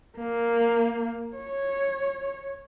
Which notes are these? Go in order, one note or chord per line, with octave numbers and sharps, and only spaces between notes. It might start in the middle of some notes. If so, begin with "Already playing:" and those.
A#3
C#5